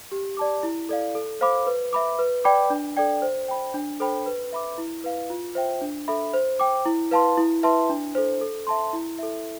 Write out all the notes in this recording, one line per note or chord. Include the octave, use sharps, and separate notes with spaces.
G4
D5 A5 D6
E4
A4 D5 F5
A4
C5 F5 B5 D6
B4
E5 B5 D6
B4
D5 G5 B5 D6
D4
A4 D5 G5
C5
G5 B5
D4
A4 C5 G5 B5
B4
E5 B5 D6
E4
B4 F5
F4
C5 E5 G5
D4
A4 E5 B5
C5
G5 D6
E4
B4 F5 A5 C6
E4
B4 E5 A5 C6
D4
A4 C5
A4
E5 A5 C6
E4
A4 E5